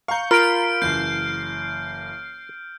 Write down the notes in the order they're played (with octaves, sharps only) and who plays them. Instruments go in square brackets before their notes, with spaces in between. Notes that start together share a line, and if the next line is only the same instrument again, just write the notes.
[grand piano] F5 A#5 [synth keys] C#6 G6
[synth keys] F4 B5 G6 [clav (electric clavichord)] A#4 [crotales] F6 D7
[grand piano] F#1 E3 [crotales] G6 [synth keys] C7